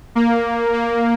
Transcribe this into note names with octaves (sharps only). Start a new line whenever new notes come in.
A#3
A#3